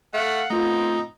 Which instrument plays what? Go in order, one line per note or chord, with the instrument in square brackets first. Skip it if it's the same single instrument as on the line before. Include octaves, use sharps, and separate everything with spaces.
[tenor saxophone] A3 [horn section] F5 F#5
[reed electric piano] A3 F4 [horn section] B3 C4 [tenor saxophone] D#4